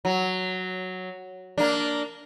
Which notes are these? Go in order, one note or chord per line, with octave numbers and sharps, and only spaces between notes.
F#3
A#3 D4